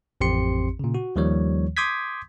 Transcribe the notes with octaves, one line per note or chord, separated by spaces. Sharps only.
A1 F2 C4 G4 C6 C#7
A#2 C#3
F#4
D#2 D#3 F3 G3 C#5
C6 D6 D#6 G6 G#6 B6